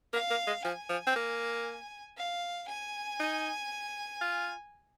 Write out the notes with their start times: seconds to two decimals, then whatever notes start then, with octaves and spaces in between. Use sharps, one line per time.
0.13 A#3 F5
0.30 A#3
0.47 G#3
0.64 F3 G#5
0.89 F3
1.07 C4
1.16 A#3
2.17 F5
2.68 G#5
3.20 D#4
4.21 F4